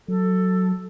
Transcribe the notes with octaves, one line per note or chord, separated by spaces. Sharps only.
F#3 A4